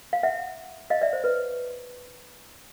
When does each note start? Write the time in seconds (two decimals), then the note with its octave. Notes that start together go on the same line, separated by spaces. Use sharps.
0.13 F5
0.23 E5 F#5
0.90 D#5 F5
1.01 D5 E5
1.13 C5
1.24 B4